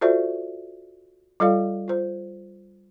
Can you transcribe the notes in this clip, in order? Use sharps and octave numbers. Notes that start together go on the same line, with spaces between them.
F4 F#4 A4 C5 D5 E5
G3 F4 A4 D5 F5
F4 C5